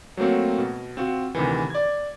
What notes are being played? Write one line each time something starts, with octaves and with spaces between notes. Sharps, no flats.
F#3 A3 A#3 C4 F#4
B2
C4 F4 F#4
D2 C3 D#3 E3
D5 G#6